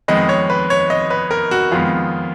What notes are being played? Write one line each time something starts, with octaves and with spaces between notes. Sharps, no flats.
F2 D#3 G#3 B3 D#5
C#5
B4
C#5
D#5
B4
A#4
F#4
F2 D#3 G#3 B3 F4